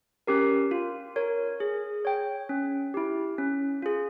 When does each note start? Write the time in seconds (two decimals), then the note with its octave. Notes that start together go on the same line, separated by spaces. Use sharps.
0.27 C#4 G4 A#4
0.71 F4
1.16 A#4 C#5
1.60 G#4
2.05 C#5 G5
2.49 C#4
2.94 E4 G4
3.38 C#4
3.82 F4 G#4